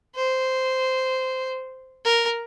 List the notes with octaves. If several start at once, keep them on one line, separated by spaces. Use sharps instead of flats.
C5
A#4